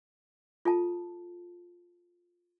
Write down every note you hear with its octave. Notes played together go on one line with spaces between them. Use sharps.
F4 A4 A5